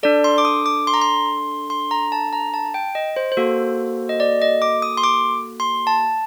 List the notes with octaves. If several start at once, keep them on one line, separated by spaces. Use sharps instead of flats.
D4 A4 D5
C6
D6
D#6
D6
C6
A#5
C6
C6
A#5
A5
A#5
A5
G5
D#5
C5
C5
A#3 F#4 A4
D#5
D5
D#5
D6
D#6
C6
D6
C6
A5